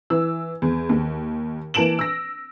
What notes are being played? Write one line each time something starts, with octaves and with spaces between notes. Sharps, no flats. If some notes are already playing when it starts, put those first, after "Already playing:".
E3 E6
E2
D#2
E3 A#3 A5 D7 E7 F#7
E6 A#6